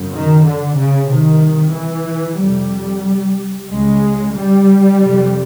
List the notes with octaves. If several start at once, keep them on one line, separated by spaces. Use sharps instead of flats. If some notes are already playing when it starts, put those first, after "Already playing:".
Already playing: F#2 C#3
D#3
D3
C#3
C2 C3 D#3
E3
F2 C3 G3
C#2 C#3 G#3
G3
F2 C3